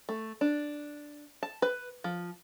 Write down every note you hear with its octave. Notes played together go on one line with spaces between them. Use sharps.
A3
D4
A5
B4
F3